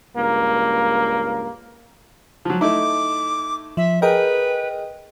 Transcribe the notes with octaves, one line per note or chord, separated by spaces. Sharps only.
C#2 G2 A#3
F3 F#3
A3 D#4 E4 D6
F3 E5
G#4 A#4 B4 D#5 G5